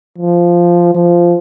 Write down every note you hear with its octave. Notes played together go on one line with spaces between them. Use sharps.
F3
F3